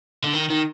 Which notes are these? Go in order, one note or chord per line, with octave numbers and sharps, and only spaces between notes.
D3
D#3
D#3